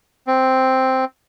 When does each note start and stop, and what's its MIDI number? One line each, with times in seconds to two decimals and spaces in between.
0.27 1.05 60